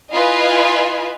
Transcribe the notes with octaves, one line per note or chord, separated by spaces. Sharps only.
E4 F4 B4 D#5 F5 G#5